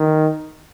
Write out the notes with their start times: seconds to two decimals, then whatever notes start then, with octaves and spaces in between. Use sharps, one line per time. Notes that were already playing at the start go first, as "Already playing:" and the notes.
Already playing: D#3